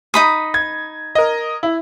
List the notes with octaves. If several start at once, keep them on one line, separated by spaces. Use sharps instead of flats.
D#4 B5 D#6
G#6
A#4 D#5
E4